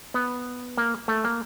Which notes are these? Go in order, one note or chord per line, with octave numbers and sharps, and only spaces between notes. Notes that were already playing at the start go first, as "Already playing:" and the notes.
B3
A#3
A3
A#3